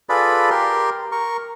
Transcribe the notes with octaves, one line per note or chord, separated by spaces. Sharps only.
F4 G#4 A4 B4 D5 B5
G4 A#4 C6
A#4 C#6